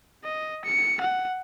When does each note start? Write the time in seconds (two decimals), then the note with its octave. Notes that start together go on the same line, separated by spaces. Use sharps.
0.24 D#5
0.65 C#7
1.01 F#5